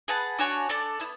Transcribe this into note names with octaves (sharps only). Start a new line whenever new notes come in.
G#4 B4 F#5 A5
D4 F#4 C#5 G#5
D4 A4 D5 A5
B3 E4